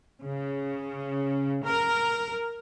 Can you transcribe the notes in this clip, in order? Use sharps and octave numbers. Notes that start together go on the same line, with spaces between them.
C#3
A#4